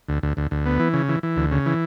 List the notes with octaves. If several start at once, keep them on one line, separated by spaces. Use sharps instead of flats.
D2
D2
D2
D2
B3
E3
C#3
E3
E3
D2
C#3
E3